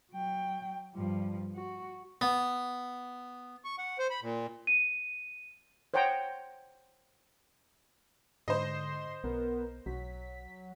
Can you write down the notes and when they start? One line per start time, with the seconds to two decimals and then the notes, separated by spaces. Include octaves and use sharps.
0.12 F#3 G5
0.95 G2 F3
1.55 F#4
2.21 B3
3.64 C#6
3.78 F#5
3.99 C5
4.10 B5
4.22 A#2
4.67 D#7
5.94 C5 C#5 F#5 G5 A#5
8.48 G#2 D3 C5 D#5 C6
9.24 B1 B3 A#4
9.86 B1 F#3 B6